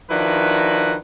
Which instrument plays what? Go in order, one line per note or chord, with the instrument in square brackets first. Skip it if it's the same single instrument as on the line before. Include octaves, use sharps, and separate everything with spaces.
[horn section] D#3 F3 D4 E4 F#4 B4